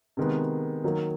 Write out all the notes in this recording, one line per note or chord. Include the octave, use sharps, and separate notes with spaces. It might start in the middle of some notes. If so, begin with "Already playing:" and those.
C3 D#3 G#3 B3
D#3 F#3 A#3